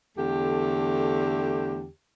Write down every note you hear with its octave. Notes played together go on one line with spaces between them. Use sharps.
E2 D3 A3 G4